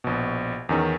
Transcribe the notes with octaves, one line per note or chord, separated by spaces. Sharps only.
A#1 B2
E2 D#3 C#4